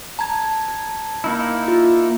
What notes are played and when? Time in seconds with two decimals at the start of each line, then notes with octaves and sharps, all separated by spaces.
0.19 A5 A#5 G#6
1.24 A#3 D#4 E4
1.68 F4